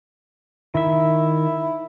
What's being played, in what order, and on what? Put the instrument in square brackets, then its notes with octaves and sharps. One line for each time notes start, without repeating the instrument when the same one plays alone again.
[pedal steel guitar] D#3 E5 [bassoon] E4